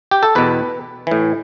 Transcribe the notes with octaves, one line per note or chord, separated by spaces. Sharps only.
G4
A4
E2 B2 B4
A2 E3